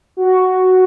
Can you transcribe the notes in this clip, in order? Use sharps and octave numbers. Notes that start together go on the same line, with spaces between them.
F#4